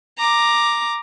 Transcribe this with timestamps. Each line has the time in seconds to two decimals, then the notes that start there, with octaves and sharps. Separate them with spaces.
0.18 A#5 D6